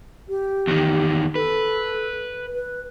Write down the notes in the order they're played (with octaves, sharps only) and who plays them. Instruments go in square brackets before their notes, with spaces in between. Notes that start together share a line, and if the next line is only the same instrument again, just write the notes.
[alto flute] G4
[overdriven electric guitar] E2 D#3
[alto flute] A4 [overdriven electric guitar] B4
[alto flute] B4